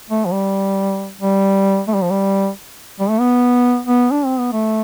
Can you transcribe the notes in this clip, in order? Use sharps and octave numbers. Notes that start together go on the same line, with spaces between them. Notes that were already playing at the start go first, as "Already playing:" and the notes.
A3
F3
G3
G3
A3
G3
F3
G3
G3
A3
B3
B3
D4
C4
B3
A3